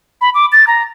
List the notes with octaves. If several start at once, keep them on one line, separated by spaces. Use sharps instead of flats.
B5
D6
A6
A#5